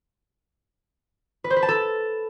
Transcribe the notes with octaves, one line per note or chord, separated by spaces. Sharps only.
B4
C5
B4
A5
A4